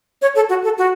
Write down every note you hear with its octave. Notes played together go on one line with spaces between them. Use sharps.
C#5
A4
F#4
A4
F#4